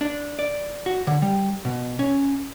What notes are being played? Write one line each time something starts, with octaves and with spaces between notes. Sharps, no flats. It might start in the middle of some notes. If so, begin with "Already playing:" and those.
D4
D5
F#4
D3
G3
B2
C#4